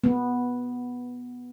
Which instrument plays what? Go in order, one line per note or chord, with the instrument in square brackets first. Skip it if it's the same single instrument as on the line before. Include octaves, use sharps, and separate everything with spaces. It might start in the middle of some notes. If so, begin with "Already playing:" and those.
[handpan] B3